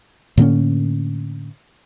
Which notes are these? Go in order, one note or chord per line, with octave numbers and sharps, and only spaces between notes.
A2 D3 A#3 C#4